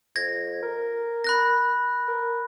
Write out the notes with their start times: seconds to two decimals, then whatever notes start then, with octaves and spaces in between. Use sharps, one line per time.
0.16 F2 G#6 A#6
0.63 A#4
1.24 B5 F#6 A#6
2.08 A#4